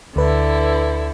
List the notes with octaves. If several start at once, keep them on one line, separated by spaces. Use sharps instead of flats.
D2 D3 E4 B4